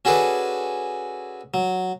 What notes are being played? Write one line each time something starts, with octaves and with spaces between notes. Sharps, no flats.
C#4 F#4 G#4 A4 B4 D5
F#3